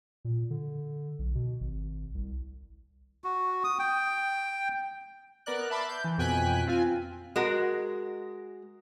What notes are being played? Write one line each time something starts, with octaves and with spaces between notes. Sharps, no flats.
A#2
D3
B1
B2
G#1
C2
F#4
D#6
G5
B3 A#4 D5 F#6
E5 A5 B5 C6 D6
G6
E3
F2 B2 G5 G#5 F#6 B6
C4 F4 G#5
G#3 F#4 A#4